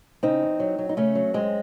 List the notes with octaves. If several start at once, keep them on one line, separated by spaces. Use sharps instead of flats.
C#3 C4 D#4
E2
F#3
F#3
D#4
C#3 A3 C#4
F#3
F#2 G#3 C4